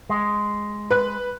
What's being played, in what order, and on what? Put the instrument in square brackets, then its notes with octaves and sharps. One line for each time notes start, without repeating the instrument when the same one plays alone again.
[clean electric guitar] G#3
[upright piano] B4 F#6